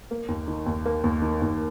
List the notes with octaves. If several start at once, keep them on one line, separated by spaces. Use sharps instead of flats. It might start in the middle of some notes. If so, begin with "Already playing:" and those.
A#3
D#2
D#3
D#2
A#3
D#2
D#3
D#2